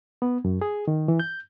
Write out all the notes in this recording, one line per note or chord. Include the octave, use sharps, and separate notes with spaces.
B3
F#2
G#4
D#3
E3
G6